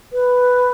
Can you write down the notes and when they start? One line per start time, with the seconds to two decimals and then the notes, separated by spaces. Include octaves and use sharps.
0.13 B4